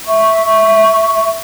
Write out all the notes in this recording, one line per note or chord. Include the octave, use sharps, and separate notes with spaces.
E5 C#6